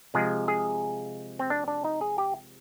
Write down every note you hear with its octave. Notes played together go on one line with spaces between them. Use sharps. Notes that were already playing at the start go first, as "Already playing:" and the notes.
C3 F3 G#3 G#4
G#4
C4
D4
D4
D#4
G#4
G4